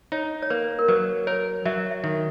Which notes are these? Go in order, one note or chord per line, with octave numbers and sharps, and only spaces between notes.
D#4 C#5
C#5
A#3 B4
A#4
F#3 B4
A#4 C#5
F#3 E5
E5
D#3